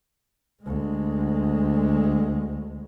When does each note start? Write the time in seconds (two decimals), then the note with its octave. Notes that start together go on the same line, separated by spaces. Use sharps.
0.63 D2 G#3